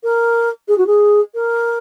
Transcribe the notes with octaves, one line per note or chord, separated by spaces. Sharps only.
A#4
G#4
F#4
G#4
A#4